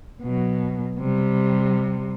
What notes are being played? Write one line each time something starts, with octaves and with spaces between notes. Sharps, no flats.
B2 F#3
C3 G3